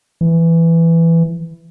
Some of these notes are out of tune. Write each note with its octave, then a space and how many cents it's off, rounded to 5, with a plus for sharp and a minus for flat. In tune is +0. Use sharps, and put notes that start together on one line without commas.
E3 +10